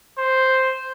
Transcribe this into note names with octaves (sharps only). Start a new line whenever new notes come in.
C5